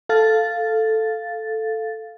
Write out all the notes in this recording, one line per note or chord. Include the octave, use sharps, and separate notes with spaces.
A4 F5 A6